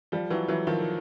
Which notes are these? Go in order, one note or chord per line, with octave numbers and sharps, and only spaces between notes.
F3 G3
E3 F#3
E3 F#3
D#3 F3